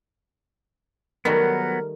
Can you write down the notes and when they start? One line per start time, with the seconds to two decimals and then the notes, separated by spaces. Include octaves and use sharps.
1.25 D#3 F#3 G3 A3 B3 A#4